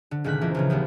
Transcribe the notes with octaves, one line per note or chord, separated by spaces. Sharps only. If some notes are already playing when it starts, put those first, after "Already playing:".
D3
C#2 A#2 D#3 A3 F#6 B6
E3 F3 C4 A#4
C#2 A#2 C#3
D#2 F3 G3 B3